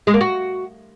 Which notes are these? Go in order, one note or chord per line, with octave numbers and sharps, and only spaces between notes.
G#3
A#3
F#4